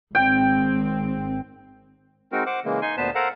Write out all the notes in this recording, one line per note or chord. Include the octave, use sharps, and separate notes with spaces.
G#1 C4 G5
G#3 C4 D#4 F#4 A#4
C5 F#5 D6
C#3 E3 G#3 A#3
D#4 G#5 C6
D2 A#2 B3 B4 C5 A5
A4 A#4 C5 F5 F#5 A#5